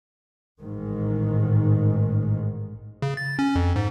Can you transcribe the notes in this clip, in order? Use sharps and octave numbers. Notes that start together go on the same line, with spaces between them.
A1 G#2 D#3
C#3
A6
C#4
F2
G#2